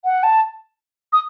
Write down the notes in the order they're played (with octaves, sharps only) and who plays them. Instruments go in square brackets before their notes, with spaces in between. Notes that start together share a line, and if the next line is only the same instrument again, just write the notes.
[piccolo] F#5
A5
D#6